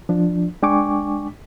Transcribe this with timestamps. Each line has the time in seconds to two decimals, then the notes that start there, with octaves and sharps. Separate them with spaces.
0.09 F3 D4
0.62 G#3 D4 G5 G#5 C#6 D6